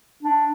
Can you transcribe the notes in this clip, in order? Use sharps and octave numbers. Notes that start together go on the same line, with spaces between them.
D4